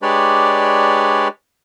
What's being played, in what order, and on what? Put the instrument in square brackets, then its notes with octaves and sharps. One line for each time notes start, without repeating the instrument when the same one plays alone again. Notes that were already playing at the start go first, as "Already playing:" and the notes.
[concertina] G#3 D4 G4 B4 C#5 D5